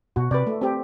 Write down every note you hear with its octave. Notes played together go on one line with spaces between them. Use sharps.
B2 F#4
C3 B4 D5
A3
C4 G4